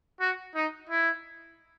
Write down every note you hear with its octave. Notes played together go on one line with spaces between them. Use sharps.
F#4
D#4
E4